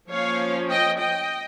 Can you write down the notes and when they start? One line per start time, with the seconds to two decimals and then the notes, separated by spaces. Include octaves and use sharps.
0.10 F3 A#3 C#4 C#5 F5
0.69 D#5 G5
0.99 D#5 G5